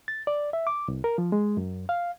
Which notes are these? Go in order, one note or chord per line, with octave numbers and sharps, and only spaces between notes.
A6
D5
E5
D6
C2
A#4
F3
G#3
F#2
F5